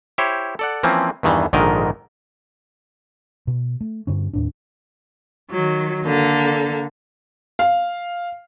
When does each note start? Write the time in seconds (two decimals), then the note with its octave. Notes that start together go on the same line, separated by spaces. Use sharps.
0.18 E4 G4 C5 C#5
0.59 A4 D5 F#5
0.83 E3 F3 A#3 C4 C#4
1.23 E2 G2 D#3 E3
1.53 A#1 G#2 D3 D#3 A#4 D#5
3.47 B2
3.81 A3
4.07 G2 D3 C#4
4.33 D#2 A2 D4
5.51 D#3 F#3
6.04 D3 A#3 A4
7.59 F5